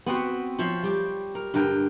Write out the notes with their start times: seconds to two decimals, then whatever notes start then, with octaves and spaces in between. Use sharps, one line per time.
0.06 B3 C4 F#4 B4
0.59 F3 C5 C#5 E5
0.83 G3 G4
1.35 A#4
1.54 G2 D3 A#4 G5